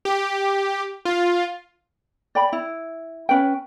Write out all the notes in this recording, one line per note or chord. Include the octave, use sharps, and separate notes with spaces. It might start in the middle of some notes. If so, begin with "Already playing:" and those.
G4
F4
D5 G5 B5
E4
C#4 B4 G5